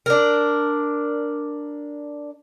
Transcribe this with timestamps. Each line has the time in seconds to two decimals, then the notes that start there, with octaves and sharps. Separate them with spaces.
0.06 D4 A#4